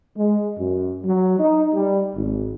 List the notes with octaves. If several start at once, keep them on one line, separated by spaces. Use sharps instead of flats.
G#3
F#2
F#3
D#4
G3
G#1